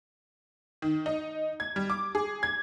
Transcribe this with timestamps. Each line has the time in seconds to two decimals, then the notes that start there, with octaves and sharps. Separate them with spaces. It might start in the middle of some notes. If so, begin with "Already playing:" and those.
0.82 D#3
1.06 D#4
1.60 G#6
1.76 G3
1.90 D6
2.15 G#4
2.43 G#6